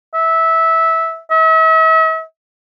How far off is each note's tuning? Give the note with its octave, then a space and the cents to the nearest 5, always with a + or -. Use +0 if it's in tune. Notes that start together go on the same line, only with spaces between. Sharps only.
E5 -15
E5 -40